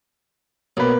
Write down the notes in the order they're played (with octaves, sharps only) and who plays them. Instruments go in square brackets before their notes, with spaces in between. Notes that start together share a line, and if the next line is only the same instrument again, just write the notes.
[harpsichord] B1 [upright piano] A#3 B4